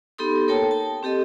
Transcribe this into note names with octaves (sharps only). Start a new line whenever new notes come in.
B3 D#4 G4 A4 C6 D#6
A#3 A4 A#4 C#5 G5 A5
A5
C4 G4 A4 D#5